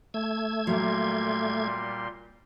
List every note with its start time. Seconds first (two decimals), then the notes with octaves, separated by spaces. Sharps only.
0.14 A3 E6 G#6
0.67 A#2 F#3 G3 A#3 C6